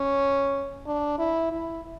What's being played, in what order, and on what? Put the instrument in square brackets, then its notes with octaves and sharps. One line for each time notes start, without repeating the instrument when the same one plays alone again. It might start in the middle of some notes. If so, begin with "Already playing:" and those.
Already playing: [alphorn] C#4
D4
E4
E4